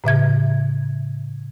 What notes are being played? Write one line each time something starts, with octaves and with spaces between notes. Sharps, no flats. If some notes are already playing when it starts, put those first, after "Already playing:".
A2 C#3 E5 G#6